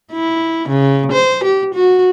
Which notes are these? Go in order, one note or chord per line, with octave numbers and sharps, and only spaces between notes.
E4
C#3
C5
G4
F#4